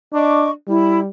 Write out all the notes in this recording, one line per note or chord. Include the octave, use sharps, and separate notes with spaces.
D4 D#5 C#6 D6
G3 E4